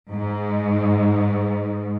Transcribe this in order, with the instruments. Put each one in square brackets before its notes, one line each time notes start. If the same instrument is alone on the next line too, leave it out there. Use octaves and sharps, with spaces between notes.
[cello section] G#2